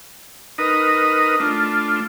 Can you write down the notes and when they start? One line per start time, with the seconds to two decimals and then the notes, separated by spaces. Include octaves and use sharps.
0.58 D#4 A#4 B4 D#5
1.40 A3 D4 F4